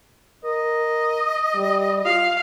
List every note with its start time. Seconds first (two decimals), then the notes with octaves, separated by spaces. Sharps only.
0.44 A#4 D#5
1.55 G3
2.05 F4 F5